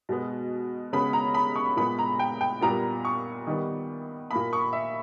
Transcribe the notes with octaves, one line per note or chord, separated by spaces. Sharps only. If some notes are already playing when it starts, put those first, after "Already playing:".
B2 G#3 B3
C#3 G#3 B3 B5
A#5
B5
C#6
A#2 G#3 B3 B5
A#5
G5
G5
A#2 G3 B3 A#5
C#6
D#3 G3 B3
A#2 A#3 B5
C#6
E5